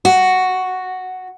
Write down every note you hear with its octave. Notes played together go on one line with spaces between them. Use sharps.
F#4